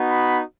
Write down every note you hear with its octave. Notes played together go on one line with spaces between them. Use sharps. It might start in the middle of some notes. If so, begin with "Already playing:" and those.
Already playing: B3 D#4 F#4
B5